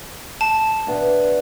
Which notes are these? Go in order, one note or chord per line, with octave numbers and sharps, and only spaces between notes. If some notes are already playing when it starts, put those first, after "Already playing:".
A5
E2 B2 B3 D4